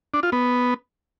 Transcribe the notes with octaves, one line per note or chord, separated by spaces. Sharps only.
D4
F4
B3